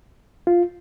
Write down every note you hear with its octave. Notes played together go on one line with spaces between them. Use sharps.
F4